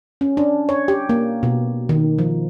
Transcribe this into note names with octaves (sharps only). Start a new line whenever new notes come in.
C#4
D4
C#5
G4
A#3
B2
D#3
F3